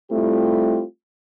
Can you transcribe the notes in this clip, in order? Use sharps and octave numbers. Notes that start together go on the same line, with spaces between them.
G3 A3 C4 E4 F4 G4